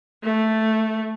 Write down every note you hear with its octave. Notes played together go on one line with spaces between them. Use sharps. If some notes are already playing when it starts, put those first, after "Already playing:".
A3